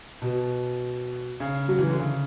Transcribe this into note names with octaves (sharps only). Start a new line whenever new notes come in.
B2
C#3
F#3
E3
D3
C#3